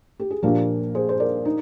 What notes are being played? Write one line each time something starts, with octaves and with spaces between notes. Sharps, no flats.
G4
G#4
A#2 F3 A#3 D4 G4 A#4
G#4 C5
C5
A#4 D5
D#4